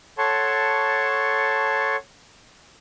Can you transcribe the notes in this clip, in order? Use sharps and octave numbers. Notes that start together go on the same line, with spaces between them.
A4 C#5 F#5 A5 C6 C#6